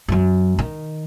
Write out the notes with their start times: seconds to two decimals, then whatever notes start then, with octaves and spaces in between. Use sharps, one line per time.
0.08 F#2 F#3
0.59 D#3